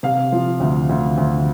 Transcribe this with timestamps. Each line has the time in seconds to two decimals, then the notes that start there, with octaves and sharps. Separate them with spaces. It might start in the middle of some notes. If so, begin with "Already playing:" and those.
0.03 C3 F5
0.32 F3
0.60 D2
0.89 D2
1.17 D2